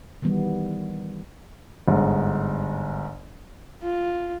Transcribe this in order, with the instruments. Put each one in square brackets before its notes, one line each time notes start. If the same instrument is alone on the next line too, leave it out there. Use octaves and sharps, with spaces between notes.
[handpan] D#3 E3 G3 B3
[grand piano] G1 G#2
[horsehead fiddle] F4